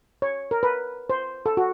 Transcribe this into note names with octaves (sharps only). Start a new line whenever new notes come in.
C#5
A#4
B4
C5
A4
F#4